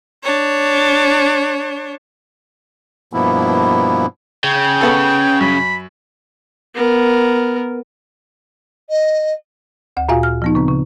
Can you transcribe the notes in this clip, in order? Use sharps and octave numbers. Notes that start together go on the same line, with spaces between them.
D4 C#5
G2 B2 F3 A#3 B3 E4
C#3 G5
B3 A4
F#2 B5
B3 A#4
D#5
D2 F#5
A#2 F4 F#4 E5 F5 G#5
F6
F3 B3 D#4
C#3 C4
C#3